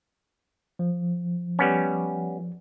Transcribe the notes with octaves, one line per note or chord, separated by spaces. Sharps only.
F3
G3 B3 C#4